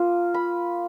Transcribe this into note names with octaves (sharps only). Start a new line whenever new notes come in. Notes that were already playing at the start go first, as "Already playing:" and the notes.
Already playing: A#3 F4
B5